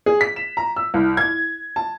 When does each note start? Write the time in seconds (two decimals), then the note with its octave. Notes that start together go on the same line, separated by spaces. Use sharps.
0.06 G#4
0.21 B6
0.36 E7
0.57 A#5
0.76 E6
0.94 C2
1.17 G#6
1.76 A5